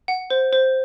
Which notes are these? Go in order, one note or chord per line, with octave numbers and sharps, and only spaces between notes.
F#5
C5
C5